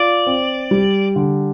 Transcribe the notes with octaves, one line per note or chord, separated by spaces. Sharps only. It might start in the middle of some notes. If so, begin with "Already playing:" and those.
Already playing: F4 D5
C4
G3
D3